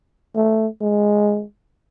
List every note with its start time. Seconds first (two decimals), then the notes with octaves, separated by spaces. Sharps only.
0.36 A3
0.81 G#3